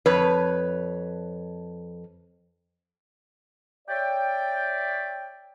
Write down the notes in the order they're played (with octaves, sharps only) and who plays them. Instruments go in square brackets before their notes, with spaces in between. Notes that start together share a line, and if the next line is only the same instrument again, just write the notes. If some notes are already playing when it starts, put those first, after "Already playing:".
[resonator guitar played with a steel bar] F2 B4 C#5
[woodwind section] C#5 D5 E5 G5